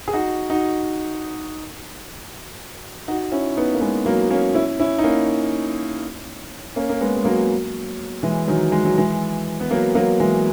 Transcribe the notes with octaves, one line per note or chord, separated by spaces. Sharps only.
G#4
D#4 F#4
D#4 F#4
D#4 F#4
C#4 E4
B3 D#4
A#3
G#3 B3
F#3 A#3
A#3 C#4
C#4 E4
C#4 E4
D#4
A#3 C#4
A#3 C#4
A#3
G#3 B3
G#3
F#3 A#3
E3 G#3
D#3 F#3
G#3
F#3
E3 G#3
B3
F#3 A#3
F#3 A#3
E3 G#3